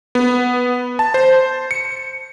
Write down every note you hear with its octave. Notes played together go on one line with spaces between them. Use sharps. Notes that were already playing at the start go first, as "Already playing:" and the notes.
B3
A5
C5
C#7